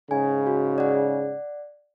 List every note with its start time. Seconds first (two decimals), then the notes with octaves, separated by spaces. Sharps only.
0.11 G#2 C#3 G#5
0.47 F#4
0.78 D5 F#5